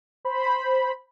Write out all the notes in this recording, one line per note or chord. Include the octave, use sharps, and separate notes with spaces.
C5 B5